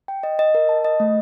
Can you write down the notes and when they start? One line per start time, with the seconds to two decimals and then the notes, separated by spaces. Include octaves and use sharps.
0.08 G5
0.23 D#5
0.39 D#5
0.55 A#4
0.69 A5
0.85 D#5
1.00 A3